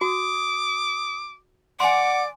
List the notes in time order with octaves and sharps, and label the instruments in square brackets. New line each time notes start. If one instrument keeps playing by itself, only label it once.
[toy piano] F#4 [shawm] D6 [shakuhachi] D#6
[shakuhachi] D5 [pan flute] F#5 [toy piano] G#5 C6 [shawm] D6